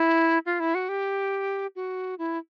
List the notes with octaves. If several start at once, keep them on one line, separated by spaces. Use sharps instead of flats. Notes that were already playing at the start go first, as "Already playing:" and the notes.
Already playing: E4
F4
E4
F#4
G4
F#4
E4